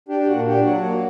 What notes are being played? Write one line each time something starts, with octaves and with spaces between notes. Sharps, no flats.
D4 G4
G4
A#2 F#4
D4 G4
F#3 F#4
A#3